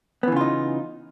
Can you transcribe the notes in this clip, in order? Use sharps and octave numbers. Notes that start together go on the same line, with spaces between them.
C#3 E3 B3 D#4 F4